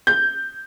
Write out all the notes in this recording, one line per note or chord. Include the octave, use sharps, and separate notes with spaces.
G6